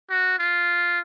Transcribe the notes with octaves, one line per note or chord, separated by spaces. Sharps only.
F#4
F4